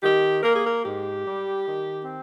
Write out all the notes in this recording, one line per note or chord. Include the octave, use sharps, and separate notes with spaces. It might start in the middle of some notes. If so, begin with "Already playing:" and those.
D#3 G4
A#3 A#4
G#4
A#4
G#2 G4
G3
D#3
C4